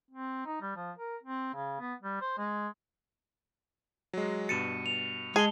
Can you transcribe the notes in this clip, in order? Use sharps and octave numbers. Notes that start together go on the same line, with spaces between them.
C4
D#4
G3
F3
A#4
C4
C#3
B3
G3
C5
G#3
F#3 G#3
G2 B2 A6 C#7 D#7 E7
F7
G#3 G#4 A5 G7